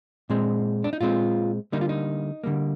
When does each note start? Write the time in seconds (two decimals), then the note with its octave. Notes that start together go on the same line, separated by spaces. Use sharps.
0.30 A#2 G#3 C4
0.84 D4
0.93 D#4
1.01 A#2 G#3 C4 F4
1.72 D3 G3 A#3 D#4
1.81 F4
1.89 D#4
2.44 D3 G3 A#3